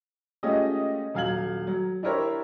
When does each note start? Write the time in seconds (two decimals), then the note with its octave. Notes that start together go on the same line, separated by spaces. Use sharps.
0.43 G#3 A3 C#4 F4 G4 D#5
1.14 D#1 F#3 F5 G#6 F#7
1.67 F#3
2.03 D4 E4 G4 A#4 C5 C#5